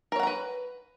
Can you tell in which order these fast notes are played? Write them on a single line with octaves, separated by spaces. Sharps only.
A#4 C#5 F#5 A#5 B4